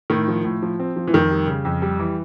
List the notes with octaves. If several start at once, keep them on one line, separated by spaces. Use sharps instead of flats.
A2 D#3
F3
A2
F3
C4
F3
E3
F2 D#3
G3
C#3
F2
G3
E3